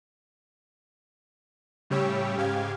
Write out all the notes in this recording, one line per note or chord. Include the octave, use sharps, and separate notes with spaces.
A2 C#3 G3 G4 C#5 E6
G#2 C#3 G4 F5 G#6